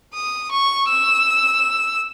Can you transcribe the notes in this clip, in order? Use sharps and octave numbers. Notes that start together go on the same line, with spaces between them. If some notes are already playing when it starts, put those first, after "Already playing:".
D#6
C#6
E6